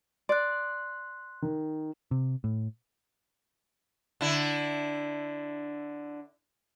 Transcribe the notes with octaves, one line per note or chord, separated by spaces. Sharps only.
D5 C6 F#6
D#3
C3
A2
D3 E4